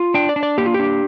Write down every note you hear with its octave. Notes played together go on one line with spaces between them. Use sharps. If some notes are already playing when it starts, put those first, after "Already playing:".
Already playing: F4
D4 G5
D5
D4
D5
A#3 G4
F4
D4 G4